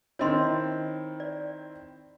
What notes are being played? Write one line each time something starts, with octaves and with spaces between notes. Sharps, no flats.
D#3 C4 E4 C#5 D#5 C6
D5